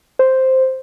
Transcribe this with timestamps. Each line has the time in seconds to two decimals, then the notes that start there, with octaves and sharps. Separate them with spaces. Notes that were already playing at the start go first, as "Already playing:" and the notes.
0.19 C5